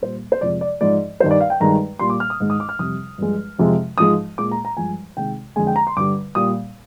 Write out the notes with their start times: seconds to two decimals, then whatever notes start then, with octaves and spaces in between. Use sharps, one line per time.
0.02 A#2 G3 C5
0.32 C5
0.41 F2 C3 F3 G#3 D5
0.61 D5
0.81 G#2 F3 G#3 D5
1.20 G2 D#3 G3 C5
1.31 D5
1.41 F5
1.50 G5
1.60 G2 D#3 G#3 A#5
1.99 A#2 G3 C6
2.10 D6
2.20 F6
2.30 D#6
2.40 G#2 D#3 G#3
2.50 D#6
2.60 D6
2.69 F6
2.79 F2 C3 G3 D#6
3.18 G2 F3 G#3
3.59 F2 C3 F3 G#3
3.98 G#2 F3 G#3 D#6
4.38 A#2 G#3 D6
4.52 A#5
4.65 A#5
4.77 G2 F3 G#3 G#5
5.17 C3 D#3 G#3 G5
5.56 F2 D3 G#3 G#5
5.67 G5
5.76 A#5
5.87 C6
5.97 G2 D3 G3 D6
6.35 A#2 G3 D#6